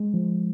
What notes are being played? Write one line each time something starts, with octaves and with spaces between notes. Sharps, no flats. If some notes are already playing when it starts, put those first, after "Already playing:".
Already playing: G#3
F3